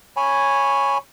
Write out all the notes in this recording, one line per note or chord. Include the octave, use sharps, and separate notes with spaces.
C#5 G#5 B5